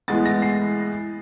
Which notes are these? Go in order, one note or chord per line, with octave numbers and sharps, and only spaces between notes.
A2 E3 G#3 B3 A6
A#6
C7